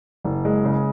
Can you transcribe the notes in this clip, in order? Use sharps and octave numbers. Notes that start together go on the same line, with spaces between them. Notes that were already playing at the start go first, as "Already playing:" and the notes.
F#1
G#3
C#3